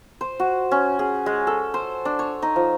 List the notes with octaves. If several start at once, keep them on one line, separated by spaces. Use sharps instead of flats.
C5
F#4
C#4
G#4
G#3
A4
C5
D4
C#5
D#4
F3